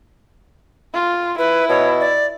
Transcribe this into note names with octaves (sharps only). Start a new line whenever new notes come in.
F4
E4 B4
B2 C#5
D5